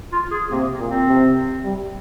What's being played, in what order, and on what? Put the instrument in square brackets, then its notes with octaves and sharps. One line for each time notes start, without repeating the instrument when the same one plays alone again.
[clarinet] F4
G#4
[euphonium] C3 [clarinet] A#3
[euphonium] A#2
[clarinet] C4
[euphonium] C3
G3